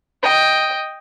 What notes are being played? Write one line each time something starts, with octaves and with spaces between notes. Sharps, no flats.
D#5 G5